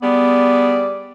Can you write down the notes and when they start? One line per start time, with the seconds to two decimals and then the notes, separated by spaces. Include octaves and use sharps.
0.03 G3 B3 G#4 D5